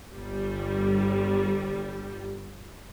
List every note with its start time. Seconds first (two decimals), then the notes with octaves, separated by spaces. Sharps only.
0.14 G1 G3